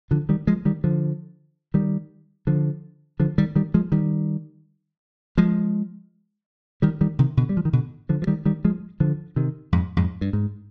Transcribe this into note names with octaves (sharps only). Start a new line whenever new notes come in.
D3 F3
D#3 G3
F3 G#3
D#3 G3
D3 F3
D#3 G3
D3 F3
D3 F3
D#3 G3
D#3 G3
F3 G#3
D#3 G3
F3 G#3
D#3 G3
D#3 G3
C3 D#3
B2 D3
G3
F3
D#3
B2 D3
D3 F3
F3
D#3 G3
D#3 G3
F3 G#3
D3 F3
C3 D#3
F2 G#2
F2 G#2
G2
G#2